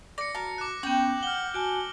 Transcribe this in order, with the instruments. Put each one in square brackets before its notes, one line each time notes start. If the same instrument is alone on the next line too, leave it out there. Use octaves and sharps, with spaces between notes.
[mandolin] D5 [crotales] A#6 C#7
[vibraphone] F#4 [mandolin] A#4 A5
[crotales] D6 F#6
[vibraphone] B3 C#4 [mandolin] G5 [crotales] G6 F#7
[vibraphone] F#5 [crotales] F6 G7
[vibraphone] F#4 G#5 A5 [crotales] D7